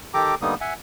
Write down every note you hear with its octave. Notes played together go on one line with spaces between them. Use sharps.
D#3 G4 A4 G5 A#5 D6
D3 G3 A#3 B3 D#4 D#6
E5 F#5 G#5